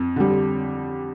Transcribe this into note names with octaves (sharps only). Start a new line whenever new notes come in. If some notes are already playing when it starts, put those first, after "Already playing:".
Already playing: F2
D3 G3